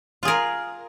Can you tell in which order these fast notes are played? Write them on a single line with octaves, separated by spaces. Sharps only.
F4 G#4 A#4